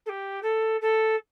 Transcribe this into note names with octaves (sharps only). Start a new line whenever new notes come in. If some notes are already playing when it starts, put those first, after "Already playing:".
A4
G4
A4
A4